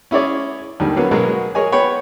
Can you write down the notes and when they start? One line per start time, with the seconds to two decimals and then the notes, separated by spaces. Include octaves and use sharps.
0.11 C#4 E4 G#4 C#5 D5
0.80 D#2 D3 D#3 G3
0.96 F#3 A#3 B3 C#4
1.11 B2 F#3 G#3 A#3 B3 A#4
1.55 G#4 A#4 C#5 D#5 G#5
1.72 B3 C#5 G5 B5